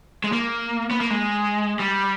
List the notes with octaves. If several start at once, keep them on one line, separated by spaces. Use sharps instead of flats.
G#3
A#3
B3
A#3
G#3
G3